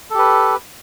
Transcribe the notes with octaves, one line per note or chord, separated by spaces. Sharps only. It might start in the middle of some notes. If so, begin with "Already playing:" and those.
G4 A4 B4